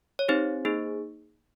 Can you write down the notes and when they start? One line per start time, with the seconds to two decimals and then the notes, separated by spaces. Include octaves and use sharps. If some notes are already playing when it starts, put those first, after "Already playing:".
0.19 C#5
0.28 C4 D#4 G4 C5
0.65 A#3 D#4 G#4